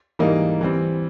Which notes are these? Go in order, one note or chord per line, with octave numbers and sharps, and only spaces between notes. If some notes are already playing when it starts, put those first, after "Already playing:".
G#2 E3 G3 A#3 D#4
E3 G3 C4